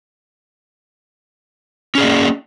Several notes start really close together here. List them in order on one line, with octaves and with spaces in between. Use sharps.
C#4 G#4 D5 A#3